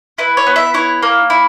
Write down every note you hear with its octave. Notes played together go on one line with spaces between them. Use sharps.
E4 B4
C#5
B3
E5
E4 C#5
A#3
E4